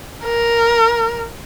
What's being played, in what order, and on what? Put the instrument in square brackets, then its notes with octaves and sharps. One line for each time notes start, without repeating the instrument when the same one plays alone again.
[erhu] A#4